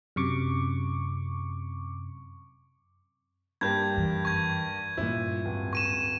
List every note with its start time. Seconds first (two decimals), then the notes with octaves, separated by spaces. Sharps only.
0.16 F#2 C3 C#6 D6
3.61 G2 A#3 G4 G6 G#6
3.96 F#2 E3
4.25 C#6 G#6
4.97 G2 A#2 C#4 E4
5.45 D1
5.73 C#6 D#7 E7